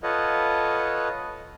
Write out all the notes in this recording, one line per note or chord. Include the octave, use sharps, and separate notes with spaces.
F4 A4 B4 C#5 D#5 F#5